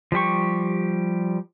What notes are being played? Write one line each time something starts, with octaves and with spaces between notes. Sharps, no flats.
F3 G3 G4 C#6